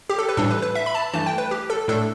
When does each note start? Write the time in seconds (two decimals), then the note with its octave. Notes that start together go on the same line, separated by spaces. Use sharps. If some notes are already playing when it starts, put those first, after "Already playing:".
0.10 G4
0.19 A4
0.29 B4
0.37 A2 E3 G3 D4 A4
0.51 B4
0.62 B4
0.75 E5
0.86 B5
0.95 A5
1.14 G2 E3 A3 A5
1.26 G5
1.38 B4
1.51 G4
1.70 A4
1.88 A2 A3 D4 A4